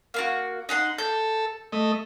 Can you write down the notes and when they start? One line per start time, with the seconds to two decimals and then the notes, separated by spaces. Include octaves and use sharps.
0.14 A#3 F4 F#4
0.69 D#4 F#5 C6
0.98 A4 G6
1.72 A3 D#5